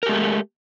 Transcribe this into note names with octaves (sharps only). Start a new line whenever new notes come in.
G#3 A3 G4 A#4